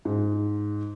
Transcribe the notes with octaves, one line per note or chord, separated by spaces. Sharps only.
G#2